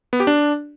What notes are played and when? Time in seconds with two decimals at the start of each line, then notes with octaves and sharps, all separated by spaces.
0.13 B3
0.20 G4
0.27 D4